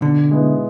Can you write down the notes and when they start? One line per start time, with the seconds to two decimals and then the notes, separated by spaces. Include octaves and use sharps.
0.02 B2 D3
0.31 G#3 B3 E4